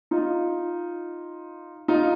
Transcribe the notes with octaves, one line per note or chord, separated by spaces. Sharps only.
D#4 F4
D#4 F4